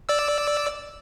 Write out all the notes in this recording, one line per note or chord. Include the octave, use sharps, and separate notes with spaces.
D5 E6